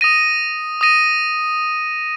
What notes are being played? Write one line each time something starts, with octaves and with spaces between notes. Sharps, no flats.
D#6 A#6 D#7
D#6 A#6 D#7